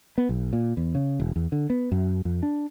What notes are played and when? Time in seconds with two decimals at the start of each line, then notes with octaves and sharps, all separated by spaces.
0.18 B3
0.29 B1
0.53 A#2
0.77 E2
0.95 C#3
1.20 E1
1.36 E2
1.52 D3
1.70 B3
1.92 F#2
2.25 F2
2.43 D4